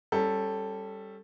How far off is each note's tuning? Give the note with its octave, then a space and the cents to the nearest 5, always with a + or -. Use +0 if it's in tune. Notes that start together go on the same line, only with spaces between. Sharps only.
G3 +0 C#4 -20 A4 +0